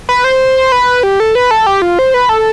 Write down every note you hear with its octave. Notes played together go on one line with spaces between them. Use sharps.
B4
C5
B4
G4
A4
B4
A4
G4
F4
C5
B4
A4